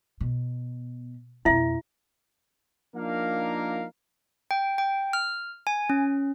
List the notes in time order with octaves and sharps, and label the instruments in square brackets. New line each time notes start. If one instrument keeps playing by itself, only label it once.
[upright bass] B2
[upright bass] F2 B2 [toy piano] E4 E5
[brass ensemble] F3 A#3 D4 D#4 A#4 F5
[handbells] G5
G5
F6
G#5
C#4